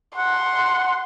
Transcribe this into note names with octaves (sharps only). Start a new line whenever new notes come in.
F#5 C6